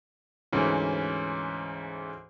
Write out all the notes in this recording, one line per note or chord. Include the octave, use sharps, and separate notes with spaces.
D2 G#2 E3 C#4